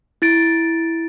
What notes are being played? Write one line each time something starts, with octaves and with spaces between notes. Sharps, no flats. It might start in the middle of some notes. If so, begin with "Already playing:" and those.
E4 A6 D7